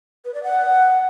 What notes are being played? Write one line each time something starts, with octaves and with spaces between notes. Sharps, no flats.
B4
D5
F#5